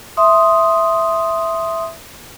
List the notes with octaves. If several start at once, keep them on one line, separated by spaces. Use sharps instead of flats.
E5 C6 D#6